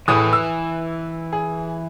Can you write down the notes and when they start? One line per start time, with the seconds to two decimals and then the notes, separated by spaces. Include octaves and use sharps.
0.08 A2 E3 G#4 B4 D#6
0.33 E6
1.33 G#4